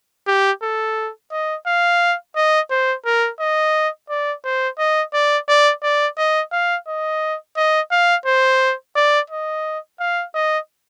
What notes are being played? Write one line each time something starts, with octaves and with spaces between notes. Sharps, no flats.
G4
A4
D#5
F5
D#5
C5
A#4
D#5
D5
C5
D#5
D5
D5
D5
D#5
F5
D#5
D#5
F5
C5
D5
D#5
F5
D#5